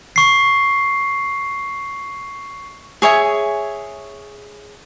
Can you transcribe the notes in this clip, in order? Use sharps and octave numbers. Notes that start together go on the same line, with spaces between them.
C#6 C7
G#4 C#5 E5 G#5